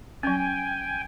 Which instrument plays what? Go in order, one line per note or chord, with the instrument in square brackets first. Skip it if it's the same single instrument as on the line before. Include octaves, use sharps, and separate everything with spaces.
[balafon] F#3 C#4 [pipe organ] G5 G#5